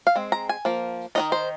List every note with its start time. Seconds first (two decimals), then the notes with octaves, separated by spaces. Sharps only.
0.07 F5
0.16 G#3 C4
0.32 A#5
0.49 G#5
0.65 F3 A#3
1.15 D#3 C4 D#4 D#5
1.32 C5